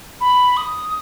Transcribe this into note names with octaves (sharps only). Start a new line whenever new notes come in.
B5
D#6